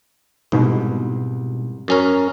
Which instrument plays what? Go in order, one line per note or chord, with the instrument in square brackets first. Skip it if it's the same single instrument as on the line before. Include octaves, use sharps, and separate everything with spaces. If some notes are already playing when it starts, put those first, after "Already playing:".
[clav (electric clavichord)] C2 [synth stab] G#2 B2
[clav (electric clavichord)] F#2 C#4 A#4